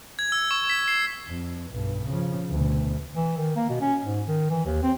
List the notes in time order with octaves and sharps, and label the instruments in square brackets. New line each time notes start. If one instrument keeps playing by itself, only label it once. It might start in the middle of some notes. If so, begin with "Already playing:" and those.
[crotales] G#6
E6
C#6
B6
C7
[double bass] F2
B1 G2
C#3 F3
D2 B2
[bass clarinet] E3
D#3
A#3
B2
C#4
G#2
D#3
E3
D#2
C4